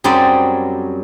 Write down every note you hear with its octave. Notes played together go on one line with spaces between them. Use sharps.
F#2 F#3 G3 C4 G#4 D5